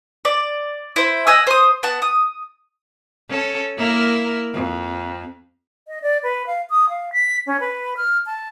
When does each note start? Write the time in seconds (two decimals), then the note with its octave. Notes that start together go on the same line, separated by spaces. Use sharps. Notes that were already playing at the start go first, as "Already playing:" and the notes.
0.25 D5
0.96 E4 C5
1.27 D#5 F#5 G#5 E6
1.47 C5 D#6
1.83 B3 F#5 A5
2.02 D#6
3.29 C#4 A4
3.77 A#3 E4 A#4
4.54 F2
5.88 D#5
6.02 D5
6.23 B4
6.47 F5
6.70 D#6
6.89 F5
7.13 B6
7.47 C#4
7.60 B4
7.97 F6
8.26 A5